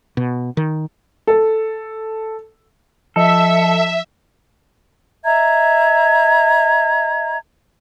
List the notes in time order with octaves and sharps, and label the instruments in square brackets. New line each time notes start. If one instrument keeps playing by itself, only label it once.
[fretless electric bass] B2
D#3
[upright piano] A4
[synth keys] F3 D#5 [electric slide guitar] A4 [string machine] E5
[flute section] D#5 E5 A#5 G#6